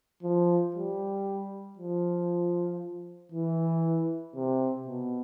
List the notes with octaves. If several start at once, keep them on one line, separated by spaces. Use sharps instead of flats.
F3
G3
F3
E3
C3
B2